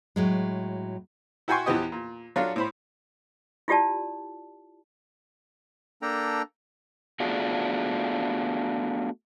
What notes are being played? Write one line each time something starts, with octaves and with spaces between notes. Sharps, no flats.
A2 F#3 G#3
E4 F#4 G5 G#5 C6 C#6
E2 E3 F3 B3 G4 D#5
A#2
F#3 D4 F4 A4 F5
A2 C5 B5
E4 F4 G4 D5 A5
A#3 D4 A4 G5 A#5
A3 B3 D4 F4 F#4 G#4